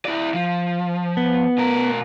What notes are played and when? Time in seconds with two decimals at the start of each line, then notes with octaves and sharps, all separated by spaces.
0.05 E4 D5
0.34 F3
1.17 B3
1.58 B2 A#4